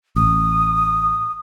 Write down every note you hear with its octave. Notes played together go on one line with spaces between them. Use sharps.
A1 D#6